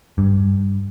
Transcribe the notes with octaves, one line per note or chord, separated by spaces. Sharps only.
G2